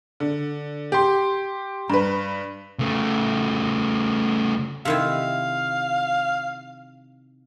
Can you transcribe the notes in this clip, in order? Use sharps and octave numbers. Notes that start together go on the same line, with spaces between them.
D3
G4 C6
G2 B4
C#3 A3
C3 D#3 E4 F5